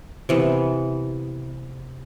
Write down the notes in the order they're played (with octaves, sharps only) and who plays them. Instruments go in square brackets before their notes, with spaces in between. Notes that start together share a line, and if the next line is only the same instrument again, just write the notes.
[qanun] C3 E3 B3